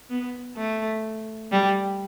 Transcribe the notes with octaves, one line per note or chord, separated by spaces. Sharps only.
B3
A3
G3